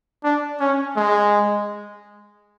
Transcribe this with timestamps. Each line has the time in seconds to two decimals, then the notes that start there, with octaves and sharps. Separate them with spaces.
0.24 D4
0.60 C#4
0.96 G#3